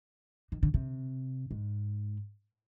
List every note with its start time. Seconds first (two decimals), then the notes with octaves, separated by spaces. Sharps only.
0.52 D#3
0.63 D3
0.74 C3
1.51 G#2